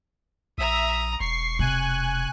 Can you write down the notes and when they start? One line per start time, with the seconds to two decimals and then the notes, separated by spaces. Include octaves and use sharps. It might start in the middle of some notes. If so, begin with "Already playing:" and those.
0.58 A#1 E5 A#5 D#6
1.20 E1 C#6 C7
1.59 C3 G#5 F#6